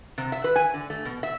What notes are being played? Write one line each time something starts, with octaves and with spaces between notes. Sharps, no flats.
C3
E5
B4
G#5
D3
A3
B2
E5